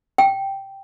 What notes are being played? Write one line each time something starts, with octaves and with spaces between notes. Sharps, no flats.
G5